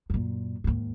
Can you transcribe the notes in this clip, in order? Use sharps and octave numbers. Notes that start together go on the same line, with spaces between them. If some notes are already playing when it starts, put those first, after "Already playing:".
F#2 A#2
D#2 G#2